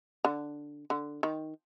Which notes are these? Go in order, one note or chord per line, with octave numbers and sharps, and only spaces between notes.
D3
D3
D#3